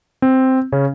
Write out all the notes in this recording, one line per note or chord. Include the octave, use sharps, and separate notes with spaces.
C4
C#3 C#4